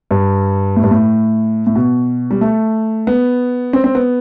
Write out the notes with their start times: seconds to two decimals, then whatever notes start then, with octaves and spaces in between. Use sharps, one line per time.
0.11 G2
0.76 A2
0.83 G2
0.91 A2
1.67 A2
1.76 B2
2.31 G3
2.41 A3
3.07 B3
3.73 C4
3.84 C4
3.95 B3